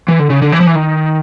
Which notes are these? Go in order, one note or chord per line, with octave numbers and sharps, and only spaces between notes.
E3
D3
C#3
D3
E3
F3
E3
D#3